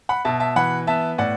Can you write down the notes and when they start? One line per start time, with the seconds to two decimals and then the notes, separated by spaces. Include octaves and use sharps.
0.09 F#5 B5
0.25 B2 E5 A5
0.40 E5 A5
0.56 E3 F#5 B5
0.87 B3 E5 A5
1.18 A2 D5 F#5